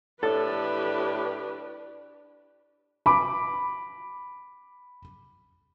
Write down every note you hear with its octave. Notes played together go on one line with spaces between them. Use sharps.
A2 D4 G4 A4 B4
B5 D6